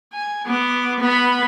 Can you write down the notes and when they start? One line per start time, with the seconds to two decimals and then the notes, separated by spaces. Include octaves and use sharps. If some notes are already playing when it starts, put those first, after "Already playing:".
0.13 G#5
0.47 B3 D6
1.00 B3 B5